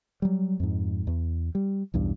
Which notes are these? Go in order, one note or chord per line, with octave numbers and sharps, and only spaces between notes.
F#3 G3
F2 G#2
E2
G3
B1 E2 G2